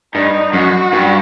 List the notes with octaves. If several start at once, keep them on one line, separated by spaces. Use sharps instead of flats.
G2 D#4
F#2 F#4
G2